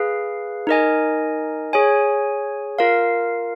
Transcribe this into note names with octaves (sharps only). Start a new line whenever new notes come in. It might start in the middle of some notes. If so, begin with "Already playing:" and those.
Already playing: G#4 B4 F5
D#4 A#4 D#5 G#5
G#4 C#5 G#5
F4 A#4 F5